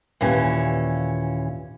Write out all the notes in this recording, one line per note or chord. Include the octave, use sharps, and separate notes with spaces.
D#2 A#2 E3 C#4